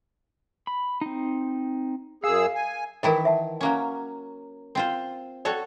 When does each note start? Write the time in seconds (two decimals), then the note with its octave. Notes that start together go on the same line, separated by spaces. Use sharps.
0.67 B5
1.01 C4 D#4
2.24 F#2 G#4 F5 E6
2.55 G#5
3.03 D#3 E3 E4 A#4 D#5
3.25 E5 F#5 A5
3.61 F#3 A#3 C#4
4.75 C4 F4 C5
5.45 F#4 A4 C#5 D5 G5